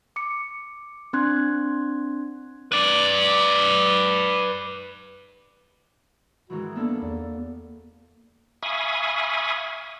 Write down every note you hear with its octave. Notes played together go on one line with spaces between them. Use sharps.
D6 C#7
C4 D4 C6 F#6 G#6
B4 D5
G#2 D#3 E3 F#4
A#3 B3 D4 A4
E2
E5 F5 G#5 B5 C#6 D#6